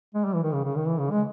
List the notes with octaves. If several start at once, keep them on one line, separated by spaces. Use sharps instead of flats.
G#3
G3
E3
D#3
C#3
C#3
D#3
E3
C#3
G#3